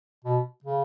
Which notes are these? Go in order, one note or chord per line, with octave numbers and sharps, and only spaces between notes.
B2
C#3